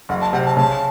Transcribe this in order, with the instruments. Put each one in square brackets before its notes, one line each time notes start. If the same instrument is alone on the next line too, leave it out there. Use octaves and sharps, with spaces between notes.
[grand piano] F#1 [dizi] F#5
[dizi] A5
[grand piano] C3 [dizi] F#5
[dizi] A5
[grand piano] C#3 [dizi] A5